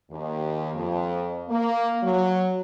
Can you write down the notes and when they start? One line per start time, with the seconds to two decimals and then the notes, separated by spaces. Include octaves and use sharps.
0.11 D#2
0.75 F2
1.49 A#3
2.03 F#3